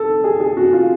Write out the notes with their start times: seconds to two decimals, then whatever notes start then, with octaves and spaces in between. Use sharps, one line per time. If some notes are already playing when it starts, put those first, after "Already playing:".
Already playing: A4
0.24 G#4
0.40 G#4
0.57 F#4
0.73 F4